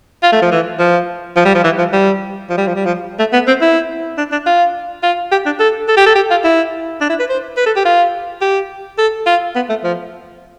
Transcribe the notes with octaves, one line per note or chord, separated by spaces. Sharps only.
F4
A3
F3
E3
F3
F3
G3
F3
E3
F3
G3
F3
G3
F3
G3
F3
A3
B3
C4
E4
D4
D4
F4
F4
G4
D4
A4
A4
G4
A4
G4
F4
E4
D4
E4
B4
C5
B4
A4
G4
F4
G4
A4
F4
B3
A3
F3